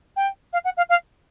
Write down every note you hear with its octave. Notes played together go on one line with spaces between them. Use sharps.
G5
F5
F#5
F5
F5